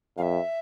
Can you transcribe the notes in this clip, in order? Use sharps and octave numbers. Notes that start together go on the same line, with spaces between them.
F2 F5
E5